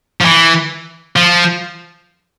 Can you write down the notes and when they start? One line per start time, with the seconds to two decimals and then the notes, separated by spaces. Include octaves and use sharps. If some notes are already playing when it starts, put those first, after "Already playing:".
0.21 F3
0.25 E3
1.16 F3